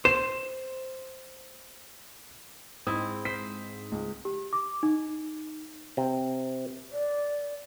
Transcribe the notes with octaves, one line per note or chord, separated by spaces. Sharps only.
C5 E7
G#2 C4 E4 D#6
C5 B6
C#2
G4
D6
D#4
C3
D5